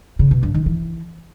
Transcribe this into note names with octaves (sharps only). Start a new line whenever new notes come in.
C#3
B2
G2
D#3
E3